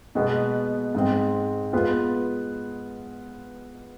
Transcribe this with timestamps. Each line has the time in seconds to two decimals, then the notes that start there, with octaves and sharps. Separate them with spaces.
0.15 B2 G#3 B3
0.95 G#2 G#3 C4
1.73 G#3 B3 F4 B4